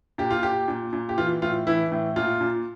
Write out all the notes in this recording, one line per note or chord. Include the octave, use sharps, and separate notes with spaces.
A#2 G4
F4
A#2 G4
A#2
A#2
G4
E3 F4
A2 F4
E3 E4
A2
A#2 F4
A#2